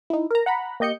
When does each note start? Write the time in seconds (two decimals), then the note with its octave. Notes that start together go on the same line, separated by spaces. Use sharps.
0.10 D#4 E4
0.31 A#4 A#5
0.46 F#5 A#5 B5
0.80 A#3 G4 D#5 G6 C#7